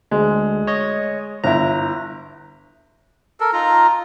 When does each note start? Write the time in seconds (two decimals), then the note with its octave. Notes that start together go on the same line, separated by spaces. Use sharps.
0.11 D2 G#3
0.67 C#5 D#5
1.44 G1 E4 A#5
3.40 A4 A#4
3.53 D#4 F4 A#5